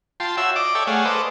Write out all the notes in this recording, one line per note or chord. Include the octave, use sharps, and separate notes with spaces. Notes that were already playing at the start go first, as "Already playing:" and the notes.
F4 G5 A5 C6
F#4 C#5 E5 E6
D5 D#5 D6
A4 C#5 D5 E5 G5
A3 G#4 C#5 F5 F#5
A4 B4 C5 D5 D#5